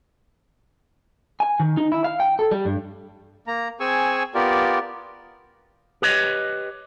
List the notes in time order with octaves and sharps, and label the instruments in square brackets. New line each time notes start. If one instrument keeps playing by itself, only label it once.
[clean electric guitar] G#5
D#3
D#4
E4
F5
G5
A4
G3
G2
[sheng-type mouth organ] A#3 A#5
C4 G#4 G#5 C#6 E6
B3 F4 G4 A#4 D5
[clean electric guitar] G4 B4 C#5 D#5